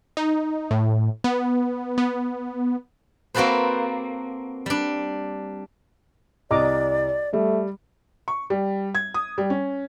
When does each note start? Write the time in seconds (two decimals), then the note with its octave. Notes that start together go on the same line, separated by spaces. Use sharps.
0.17 D#4
0.71 A2
1.24 B3
1.98 B3
3.34 A#3 C4 F#4 A4 B4 C5
4.66 G3 D4
6.51 C2 D5 D#5 A#5 D6
7.33 G3 A3
8.28 C#6
8.50 G3
8.95 G#6
9.14 D#6
9.38 G3
9.50 C#4